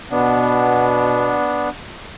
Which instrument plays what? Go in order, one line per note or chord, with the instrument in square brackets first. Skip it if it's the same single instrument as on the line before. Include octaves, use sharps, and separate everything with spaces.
[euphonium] B2 [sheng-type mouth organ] B3 D4